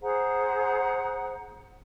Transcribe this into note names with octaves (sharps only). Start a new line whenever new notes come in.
G#4 C5 F#5 A#5